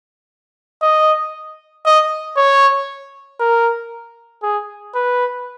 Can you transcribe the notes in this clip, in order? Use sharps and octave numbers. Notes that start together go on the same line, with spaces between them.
D#5
D#5
C#5
A#4
G#4
B4